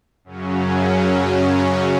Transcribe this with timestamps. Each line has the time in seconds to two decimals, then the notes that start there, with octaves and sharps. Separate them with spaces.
0.24 F#2 C#3 F#3 C#4